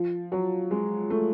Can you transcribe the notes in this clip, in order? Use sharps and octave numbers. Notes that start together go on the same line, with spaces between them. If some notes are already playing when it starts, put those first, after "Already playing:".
Already playing: F3
F#3
G#3
A3